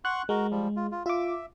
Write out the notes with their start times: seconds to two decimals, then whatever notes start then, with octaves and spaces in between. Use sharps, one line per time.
0.05 F#5 C6 C#6 F#6
0.29 G#3 F#4 A#4
0.51 F3 G3
0.77 F4
0.92 F4
1.06 F4 E5 D6